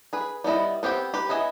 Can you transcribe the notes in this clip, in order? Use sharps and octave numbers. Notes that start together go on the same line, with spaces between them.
G#4 B4
G3 B3 E4 D#5
B3 C4 G4 F5 G5
G4 B4
B3 E4 D#5 E5 G#5